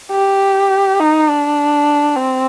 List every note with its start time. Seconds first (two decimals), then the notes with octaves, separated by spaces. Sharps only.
0.12 G4
1.00 D#4
1.29 D4
2.16 C4